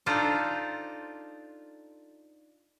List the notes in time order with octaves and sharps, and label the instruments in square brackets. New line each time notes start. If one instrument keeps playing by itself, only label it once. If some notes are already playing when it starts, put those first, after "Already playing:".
[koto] D4 D#4 F4 A4 C5